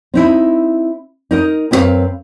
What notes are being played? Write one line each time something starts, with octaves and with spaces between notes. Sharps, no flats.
C4 D#4 E4
D#4 A#4 D#5
F#2 C4 E4 F#4 B4 F5